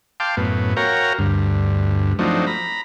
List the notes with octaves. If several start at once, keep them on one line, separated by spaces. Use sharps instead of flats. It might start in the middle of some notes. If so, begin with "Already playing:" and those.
F5 G5 A5 C6 D6
F#2 A2 B3
F#4 A#4 C#5 F5 G5 A#5
D2 G2
F3 F#3 A3 C4 D4 D#4
A#5 B5